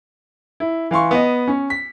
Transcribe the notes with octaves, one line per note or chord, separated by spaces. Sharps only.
E4
E3 F5 C6 C#6
B3 D#5
C#4
B6